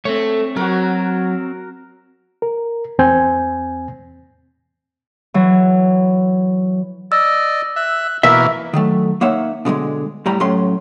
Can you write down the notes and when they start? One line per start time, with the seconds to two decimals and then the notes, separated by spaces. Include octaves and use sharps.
0.05 A3 C4 C#5
0.56 F#3 F#4 A#4
2.42 A#4
2.99 E2 C4 G#5 G6
5.34 E3 F#3
7.12 D5 D#5 E6
7.76 E5 F#6
8.23 B2 E3 A#3 A#4 E5
8.73 D#3 F#3 A3
9.21 A#3 D#4 C#5 E5 F#5
9.65 B2 D3 F#3 G#3
10.26 A2 G3 A#5
10.40 A2 F#3 A3 C#4 C6